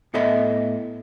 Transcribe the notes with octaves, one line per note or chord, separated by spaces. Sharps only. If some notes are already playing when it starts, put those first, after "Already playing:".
A2 B3 A4 D#5 E5 B5